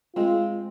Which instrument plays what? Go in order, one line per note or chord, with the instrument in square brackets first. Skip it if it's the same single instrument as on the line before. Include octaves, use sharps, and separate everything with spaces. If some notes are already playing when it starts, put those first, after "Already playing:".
[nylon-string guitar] G#3 C4 [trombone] F4